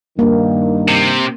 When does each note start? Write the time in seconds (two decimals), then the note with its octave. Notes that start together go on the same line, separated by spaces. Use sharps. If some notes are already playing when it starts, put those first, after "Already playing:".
0.19 G2 D#3 A#3
0.88 C3